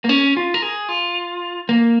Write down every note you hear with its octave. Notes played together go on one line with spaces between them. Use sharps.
A#3
C#4
F4
A#4
G#4
F4
A#3